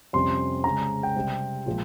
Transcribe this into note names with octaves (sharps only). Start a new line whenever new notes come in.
F2 C3 G3 C#4 C6
C#3 G#3 C#4 A#5
G5
C3 G3 C4
A#2 F3 G#3